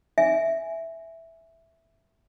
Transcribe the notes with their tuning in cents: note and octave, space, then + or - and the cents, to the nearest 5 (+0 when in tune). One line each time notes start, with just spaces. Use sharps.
E5 +0 G#5 +0